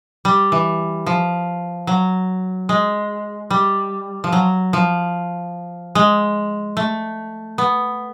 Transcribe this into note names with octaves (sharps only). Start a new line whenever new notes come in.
G3
E3
F3
F#3
G#3
G3
F3
F#3
F3
G#3
A3
B3